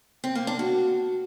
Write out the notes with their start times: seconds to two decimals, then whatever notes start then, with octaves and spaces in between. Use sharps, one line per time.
0.24 C4
0.35 A#3
0.47 D4
0.59 F#4